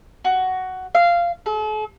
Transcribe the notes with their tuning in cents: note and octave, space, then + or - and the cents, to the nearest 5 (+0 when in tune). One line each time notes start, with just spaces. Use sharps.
F#4 +10
F5 -15
A4 -45